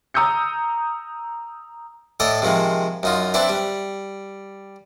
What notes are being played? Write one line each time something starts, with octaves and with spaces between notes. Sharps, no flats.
A#5 D#6 E6 G6 C#7
A2 A4 D5 D#5
C3 D#3 F3 G#3
F#2 D#4 F4
C4 D4 E4 B4
G3